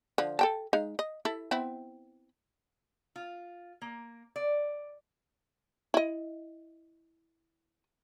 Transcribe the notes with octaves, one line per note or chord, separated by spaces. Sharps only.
D3 F3
A4 G5 A5
G#3 D#4 F5
D#5
E4 A4
B3 C4 E4
F4
A#3
D5
E4 D#5